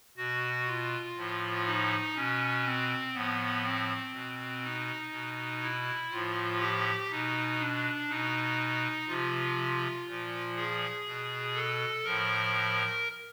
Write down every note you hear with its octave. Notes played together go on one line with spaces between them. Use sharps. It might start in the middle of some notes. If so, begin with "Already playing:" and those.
B2 F#4
F4
A2 F3
D#4
B2 C#4
C4
A2 F3 B3
C4
B2
D#4
B2
E4
A2 F3 F4
G4
B2 D#4
D4
B2 D#4
C3 F3 F4
A#2 F3
G#4
B2
A4
A2 F3 A#4